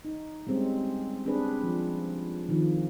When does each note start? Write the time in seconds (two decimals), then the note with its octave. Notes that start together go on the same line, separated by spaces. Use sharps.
0.05 D#4
0.47 G3 G#3 C4 C#4
1.26 C4 D4 G#4 B4
1.63 F3
2.48 D#3 F3